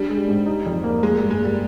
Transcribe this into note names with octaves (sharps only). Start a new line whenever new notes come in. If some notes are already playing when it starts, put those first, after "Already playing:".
Already playing: G3 D4
G#3
G#2
D#4
F2
A#3
G#3 A#3
G2 G3
G#3
G3 A#3